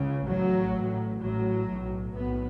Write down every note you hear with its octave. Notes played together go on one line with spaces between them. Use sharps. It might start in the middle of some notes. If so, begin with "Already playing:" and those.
Already playing: C#2 C#3
A1 A2 F#3
A1 A2
A1 A2 F#3
B1 A2
B1 A2 B3